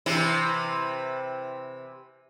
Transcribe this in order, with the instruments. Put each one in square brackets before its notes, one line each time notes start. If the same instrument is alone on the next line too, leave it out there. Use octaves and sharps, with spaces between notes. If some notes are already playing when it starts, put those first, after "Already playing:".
[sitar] C3 E3 E4